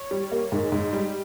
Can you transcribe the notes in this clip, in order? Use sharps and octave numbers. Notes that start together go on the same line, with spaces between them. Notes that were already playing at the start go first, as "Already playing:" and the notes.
Already playing: C#5
G3
A#3
G#2
G#2
G3